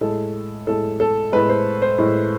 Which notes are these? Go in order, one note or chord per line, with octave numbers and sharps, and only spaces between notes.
A2 G#3 A4
A2 G#3 A4
A4
A2 G#3 B4
C5
C5
A2 G#3